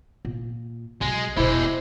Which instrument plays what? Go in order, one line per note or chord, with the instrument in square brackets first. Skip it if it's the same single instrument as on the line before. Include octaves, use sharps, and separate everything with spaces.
[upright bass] A#2
[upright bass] B1 [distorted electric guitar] G#3
[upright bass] E1 B2 [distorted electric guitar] G#3 G4 [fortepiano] E4 [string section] C5